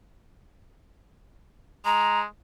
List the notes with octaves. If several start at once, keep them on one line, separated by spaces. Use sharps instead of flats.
G#3 A#5